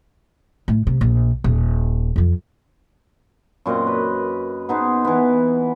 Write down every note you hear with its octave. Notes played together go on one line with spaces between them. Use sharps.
A2
C3
A#1
D#1
F2 F3
F#2 A#2 C4 D#5
B4
B3 D#4 G#4 C5
E3 B3